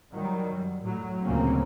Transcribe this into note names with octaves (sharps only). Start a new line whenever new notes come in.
D#3 F#3 G3
F#2
A2 F#3
D2 A#2 C#3 A#3 C4 C#4